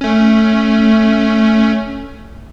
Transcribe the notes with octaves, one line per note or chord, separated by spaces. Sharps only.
A3 C#4